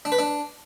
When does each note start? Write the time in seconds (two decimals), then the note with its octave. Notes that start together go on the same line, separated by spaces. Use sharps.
0.05 D4
0.12 B4
0.19 D4